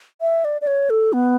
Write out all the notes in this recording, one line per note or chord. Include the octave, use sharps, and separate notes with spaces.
E5
D5
D5
C#5
A4
B3